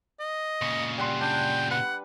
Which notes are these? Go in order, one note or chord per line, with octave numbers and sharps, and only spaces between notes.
D#5
A#2 C#3 C#6
G3 F#5 C6
D4 G5
B4 F#5